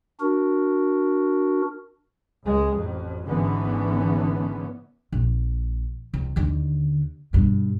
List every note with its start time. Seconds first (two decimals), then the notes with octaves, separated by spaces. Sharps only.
0.20 D4 F#4 A#4
2.44 C#2 G#3
2.76 A1 F2
3.27 G#1 G#2 D3 E3 B3 C#4
5.12 A#1
6.14 C2
6.36 D#2 D3
7.33 G2 B2